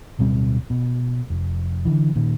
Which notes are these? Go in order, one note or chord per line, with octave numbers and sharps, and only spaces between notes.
D1 B2 G3 C4
B2
F1
D3 E3
A#2 D#3